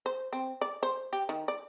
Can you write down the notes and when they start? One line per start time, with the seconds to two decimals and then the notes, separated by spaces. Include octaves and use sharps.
0.06 C5
0.33 C4
0.61 D5
0.83 C5
1.13 G4
1.29 D#3
1.48 D5